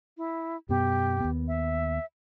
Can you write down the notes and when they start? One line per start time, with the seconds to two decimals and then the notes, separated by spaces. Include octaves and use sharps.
0.17 E4
0.69 F#2 B2 B3 G4
1.20 D#2 B3
1.48 E5